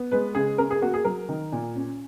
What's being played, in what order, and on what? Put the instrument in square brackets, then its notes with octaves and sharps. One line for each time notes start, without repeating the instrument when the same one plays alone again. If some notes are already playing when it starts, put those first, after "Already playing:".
Already playing: [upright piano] B3
G#3 B4
C#3 G#4
C#4 A#4
G#4
A#3 F#4
G#4
F#3 A#4
D#3
A#2
C#4